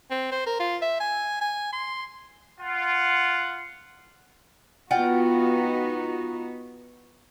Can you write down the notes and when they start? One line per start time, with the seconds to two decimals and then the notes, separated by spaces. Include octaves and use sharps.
0.11 C4
0.32 C5
0.46 A#4
0.60 F4
0.82 E5
1.00 G#5
1.41 G#5
1.73 C6
2.59 F4 F#5
4.91 B3 D#4 F4 F#4 F#5 G5